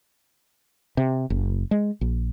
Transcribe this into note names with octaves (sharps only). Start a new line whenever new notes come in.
C3
F#1
G#3
A#1